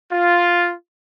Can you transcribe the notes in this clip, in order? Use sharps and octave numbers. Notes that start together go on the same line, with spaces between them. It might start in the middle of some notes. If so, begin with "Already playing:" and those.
F4